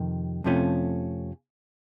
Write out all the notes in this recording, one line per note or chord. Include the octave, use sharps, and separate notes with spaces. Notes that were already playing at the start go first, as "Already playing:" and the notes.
Already playing: F2 C3 D#3
F2 C3 F3 A3 C#4